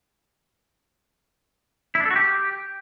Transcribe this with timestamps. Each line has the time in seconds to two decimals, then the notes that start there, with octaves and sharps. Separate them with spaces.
1.95 E4
2.00 D4
2.05 A4
2.11 F#4
2.16 G4